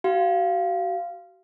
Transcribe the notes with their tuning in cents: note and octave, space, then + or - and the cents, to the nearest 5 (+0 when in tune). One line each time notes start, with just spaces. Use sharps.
F#4 +35 F5 -15